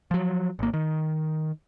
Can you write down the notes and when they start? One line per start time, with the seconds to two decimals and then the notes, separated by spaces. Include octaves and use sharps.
0.11 F3 F#3
0.59 G#1 A#3
0.74 D#3